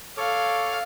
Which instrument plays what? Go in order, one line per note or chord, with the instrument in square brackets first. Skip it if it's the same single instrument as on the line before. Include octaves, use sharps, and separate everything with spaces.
[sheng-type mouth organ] A4 C#5 D6 [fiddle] F5